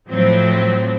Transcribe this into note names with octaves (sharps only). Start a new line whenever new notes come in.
A2 F3 F#3 C4